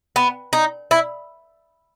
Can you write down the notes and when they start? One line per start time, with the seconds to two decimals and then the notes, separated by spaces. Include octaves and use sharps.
0.16 B3
0.53 D#4
0.91 E4